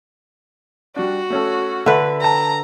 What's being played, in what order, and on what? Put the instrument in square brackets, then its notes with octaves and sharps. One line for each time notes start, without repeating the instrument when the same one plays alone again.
[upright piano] G3 D4 [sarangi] F#4
[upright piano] A3 C#4 A4
[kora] D3 B4 [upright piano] E5 E6
[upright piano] G5 A5 [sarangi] A#5